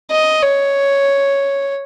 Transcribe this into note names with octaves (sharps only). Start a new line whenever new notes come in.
D#5
C#5